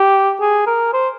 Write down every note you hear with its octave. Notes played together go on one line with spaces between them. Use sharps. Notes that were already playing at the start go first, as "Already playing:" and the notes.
Already playing: G4
G#4
A#4
C5